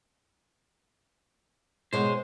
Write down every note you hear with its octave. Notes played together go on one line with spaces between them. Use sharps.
B2 G#3 C5 C#5